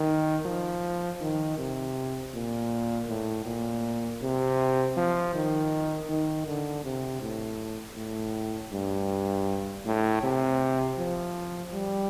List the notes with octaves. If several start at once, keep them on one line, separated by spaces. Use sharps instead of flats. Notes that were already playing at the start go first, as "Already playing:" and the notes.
Already playing: D#3
F3
D#3
C3
A#2
A2
A#2
C3
F3
D#3
D#3
D3
C3
A2
A2
G2
A2
C3
F3
G3